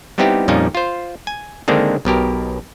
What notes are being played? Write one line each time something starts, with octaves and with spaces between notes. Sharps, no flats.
G3 B3 C4 D#4 E4 G4
F2 A#2 F3 G3 C#4 D#4
F4 C5
G#5
D3 D#3 G#3 A#3 C4 D4
B1 B2 G4 A#4